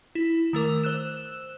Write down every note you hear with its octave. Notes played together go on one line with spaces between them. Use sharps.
E4
D#3 A3 A#4 D6
C5 E6 F#6 E7